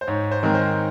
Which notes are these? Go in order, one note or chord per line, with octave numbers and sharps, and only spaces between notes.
C5
G#2 C#5
C5
D#3 G#3 C4 A#4
C5